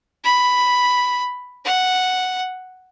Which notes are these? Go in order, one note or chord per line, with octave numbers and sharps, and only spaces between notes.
B5
F#5